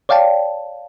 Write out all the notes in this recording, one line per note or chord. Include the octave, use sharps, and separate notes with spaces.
C#5 D5 F5 G5 A5